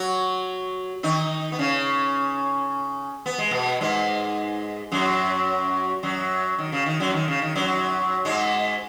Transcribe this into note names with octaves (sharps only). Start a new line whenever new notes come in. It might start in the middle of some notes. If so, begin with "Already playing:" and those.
Already playing: F#3 F#4
D#3 D#4
B3
C#3 C#4
B3
G#3
B2 B3
G#2 G#3
F#2 F#3
F#2 F#3
D#3
C#3
D#3
F#2 F#3
D#3
C#3
D#3
F#2 F#3
G#2 G#3